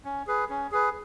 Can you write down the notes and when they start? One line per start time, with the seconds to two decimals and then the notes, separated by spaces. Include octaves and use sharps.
0.05 C#4
0.27 G#4 B4
0.49 C#4
0.72 G#4 B4